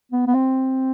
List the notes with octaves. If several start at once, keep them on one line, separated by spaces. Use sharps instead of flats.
B3
B3
C4